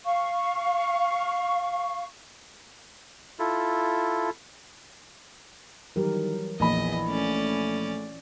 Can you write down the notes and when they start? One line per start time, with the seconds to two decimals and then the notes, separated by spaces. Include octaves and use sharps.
0.05 F5 C#6
3.39 E4 F4 A4
5.96 D#3 E3 F#3 G3 A#4
6.60 A#1 E2 E3 F3 E4 D#5 B5
7.08 A3 C#4 D5